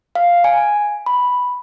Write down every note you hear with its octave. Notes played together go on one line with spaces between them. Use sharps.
F5
G#5
B5